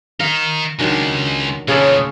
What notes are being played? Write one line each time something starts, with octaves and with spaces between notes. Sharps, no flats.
D#3 D#4 F5
C#2 D#3 F#3 G#3 D4
A#2 C#3 E3 C#4 A4 C#5 D#6